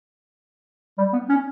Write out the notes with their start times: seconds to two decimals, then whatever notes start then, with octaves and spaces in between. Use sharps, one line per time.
0.98 G3
1.13 B3
1.29 C#4